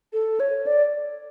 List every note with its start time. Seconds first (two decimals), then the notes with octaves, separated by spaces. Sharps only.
0.13 A4
0.40 C#5
0.66 D5